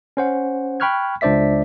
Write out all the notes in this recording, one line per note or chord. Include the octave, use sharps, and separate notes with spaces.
C#4 C5 F#5
G5 B5 C#6 F6 F#6 G#6
C#2 D4 C5 D5 E5 B6